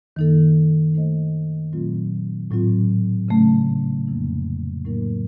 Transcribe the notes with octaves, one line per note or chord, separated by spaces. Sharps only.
F#2 D#3 A#3 D#4 A4
A3 D#4 A4 C5 D#5
A#2 F#3 A3 C4 F4
A2 F#3 C4 F4
C#3 F#3 A3 C#4
F2 C3 F3 A#3 D#4
A2 F#3 A#3 D#4 A#4